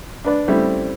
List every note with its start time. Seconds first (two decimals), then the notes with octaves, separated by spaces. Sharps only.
0.25 D4 B4 D5
0.48 C#3 G3 A3 C4 E4